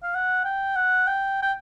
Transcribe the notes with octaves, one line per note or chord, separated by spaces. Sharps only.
F5
F#5
G5
F#5
G5
G5